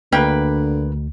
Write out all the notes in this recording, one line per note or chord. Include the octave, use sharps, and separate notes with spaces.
D2 D3 A#3 B4 G5